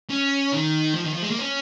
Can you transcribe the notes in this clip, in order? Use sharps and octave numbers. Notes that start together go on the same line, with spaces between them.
C#4
D#3
F3
D#3
F3
G#3
A#3
C#4